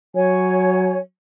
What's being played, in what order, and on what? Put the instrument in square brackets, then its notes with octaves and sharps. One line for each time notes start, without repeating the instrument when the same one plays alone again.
[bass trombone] F#3 [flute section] C#5 G#5